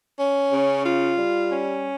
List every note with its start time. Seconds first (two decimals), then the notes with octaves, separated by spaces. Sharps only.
0.17 C#4
0.50 C#3
0.84 F4
1.17 G3
1.50 C#4